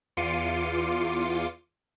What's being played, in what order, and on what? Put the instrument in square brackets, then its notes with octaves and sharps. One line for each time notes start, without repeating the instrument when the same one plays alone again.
[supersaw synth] E2 F4 C6 D6 C#7 D#7